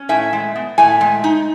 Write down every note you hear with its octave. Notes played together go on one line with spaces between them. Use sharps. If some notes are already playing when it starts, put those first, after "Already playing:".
Already playing: C#4
A2 E5 G#5
G#3
B3
A2 E5 G#5
G#3
D#4